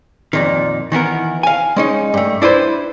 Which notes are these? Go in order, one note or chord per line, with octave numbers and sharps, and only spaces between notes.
F2 A#2 D#3
D#3 E3 B3 A#4
F5 G#5
G#3 C#4 D#4
G2 A3
D4 E4 B4 C5